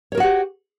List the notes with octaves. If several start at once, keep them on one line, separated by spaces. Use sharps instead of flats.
F#4 G4 A#4 C#5 F#5